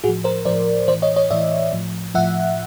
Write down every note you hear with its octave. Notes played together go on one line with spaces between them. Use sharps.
A2 F3 F#4 G#4
A#4 C5
A2 F3 C5 D5
A2 E3 C5 D5
C#5 D#5
C#5 D#5
A2 E3 D5 E5
A2 F3
A2 F3 E5 F#5